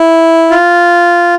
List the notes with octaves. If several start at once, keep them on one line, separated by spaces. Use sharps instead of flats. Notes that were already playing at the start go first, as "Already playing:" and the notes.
Already playing: E4
F4